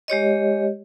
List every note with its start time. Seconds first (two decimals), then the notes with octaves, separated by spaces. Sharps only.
0.08 G#3 G4 C#5 D#5